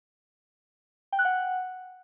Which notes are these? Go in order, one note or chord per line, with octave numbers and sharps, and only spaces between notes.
G5
F#6
F#5